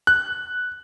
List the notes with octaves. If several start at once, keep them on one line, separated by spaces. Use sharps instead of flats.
F#6